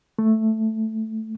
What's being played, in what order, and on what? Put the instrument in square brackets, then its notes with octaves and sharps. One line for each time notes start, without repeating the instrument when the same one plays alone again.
[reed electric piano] A3